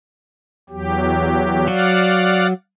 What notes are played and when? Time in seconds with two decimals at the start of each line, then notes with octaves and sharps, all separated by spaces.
0.70 E2 F#3 G4
1.68 F#3 D5 F5 F#5